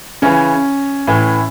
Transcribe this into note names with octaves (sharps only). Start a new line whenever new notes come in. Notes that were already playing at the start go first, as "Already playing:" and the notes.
C#3 E3 C#4
A2 E3